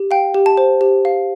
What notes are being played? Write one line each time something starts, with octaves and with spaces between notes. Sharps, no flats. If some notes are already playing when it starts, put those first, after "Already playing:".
Already playing: G4
F5 G5
G4
A5
C5
G4
F5